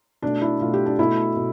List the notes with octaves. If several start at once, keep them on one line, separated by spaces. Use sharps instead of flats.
B2 A3 D4
E4
B2 A3 F4
G4
D4
B2 A3 E4
B2